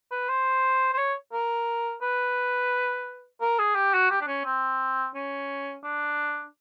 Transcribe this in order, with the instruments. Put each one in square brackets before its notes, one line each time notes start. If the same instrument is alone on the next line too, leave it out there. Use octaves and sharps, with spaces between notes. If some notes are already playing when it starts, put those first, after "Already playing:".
[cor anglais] B4
C5
C5
C#5
A#4
B4
A#4
G#4
G4
F#4
G4
D4
C#4
C4
C#4
D4